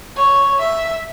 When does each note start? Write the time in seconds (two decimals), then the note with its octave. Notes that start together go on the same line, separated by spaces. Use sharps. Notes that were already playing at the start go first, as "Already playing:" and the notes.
0.17 C#5
0.59 E5